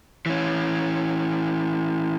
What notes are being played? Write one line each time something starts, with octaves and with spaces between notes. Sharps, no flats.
E3 C#4